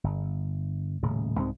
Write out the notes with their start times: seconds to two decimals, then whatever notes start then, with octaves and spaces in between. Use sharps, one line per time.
0.04 G1
1.03 D#1 A2 C#3
1.39 C2 G#2 C3 C4